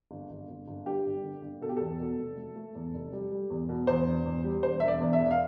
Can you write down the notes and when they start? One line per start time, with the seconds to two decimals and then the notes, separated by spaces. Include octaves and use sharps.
0.11 G1
0.30 G1
0.49 G1
0.68 G1
0.86 G2 G4
1.06 G1
1.24 D3
1.42 G1
1.61 B2 A4
1.69 G4
1.77 E2 A4
1.99 B2
2.18 F1
2.37 A3
2.56 A3
2.75 E2
2.94 F1
3.13 G3
3.31 G3
3.50 E2
3.69 B2
3.87 E2 C5
4.06 E1
4.25 E2
4.44 G3
4.63 E1 C5
4.80 E1 E5
4.88 D5
5.00 E2
5.13 E5
5.19 E1
5.31 F5